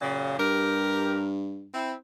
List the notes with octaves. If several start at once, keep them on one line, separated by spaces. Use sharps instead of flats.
F#2 A#2 C#3
G2 G4 A#4
C4 E4